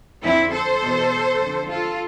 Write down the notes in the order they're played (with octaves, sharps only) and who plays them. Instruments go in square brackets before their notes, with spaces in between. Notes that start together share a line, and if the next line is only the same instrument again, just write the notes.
[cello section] F2 D3 C4 E4
A4 C5
E2 B2
F2 D3
F4 A4